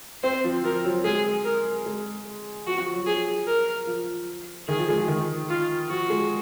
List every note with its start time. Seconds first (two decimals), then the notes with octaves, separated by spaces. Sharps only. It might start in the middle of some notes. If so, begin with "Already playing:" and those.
0.23 C4 C5
0.44 F3
0.64 F3 A#4
0.85 F#3
1.04 G#3 G#4
1.45 A#4
1.86 G#3
2.66 F3 F#4
2.80 F3
2.94 F#3
3.06 F3 G#4
3.47 A#4
3.87 F3
4.68 D#3 G#4
4.79 F3
4.89 G#3
4.98 F3
5.08 D#3
5.50 F4
5.89 F3 F#4
6.10 G#3